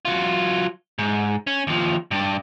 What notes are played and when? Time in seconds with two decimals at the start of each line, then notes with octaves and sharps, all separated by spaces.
0.05 F#3 F4
0.99 G#2
1.47 C#4
1.67 D#2 F3
2.11 G2 D4